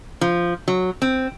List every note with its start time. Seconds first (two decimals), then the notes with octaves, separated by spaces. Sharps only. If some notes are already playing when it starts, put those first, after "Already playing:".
0.21 F3
0.68 F#3
1.02 C4